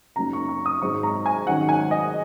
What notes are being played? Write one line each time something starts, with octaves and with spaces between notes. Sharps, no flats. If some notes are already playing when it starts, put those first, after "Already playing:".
F#2 C#3 F#3 A#3 D#4 A#5
C#6
C#6
D#6
G#1 G#2 F#3 C#6
A#5
G#5
G#2 D#3 F#3 C#4 F#5
G#5
D#5